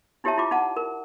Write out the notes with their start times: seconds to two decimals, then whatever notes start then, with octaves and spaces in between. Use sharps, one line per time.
0.24 D#4 E4 G4 C#5 E5 A5
0.37 E4 F4 D6
0.51 D#4 F#5 A5
0.77 A#4